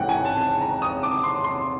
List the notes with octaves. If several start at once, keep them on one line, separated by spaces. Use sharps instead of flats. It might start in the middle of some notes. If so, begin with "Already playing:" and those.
Already playing: A1 G#2 E3 A3 F#5 G5
G#5
A5
A5
A#5
D#6
D6
C6
C6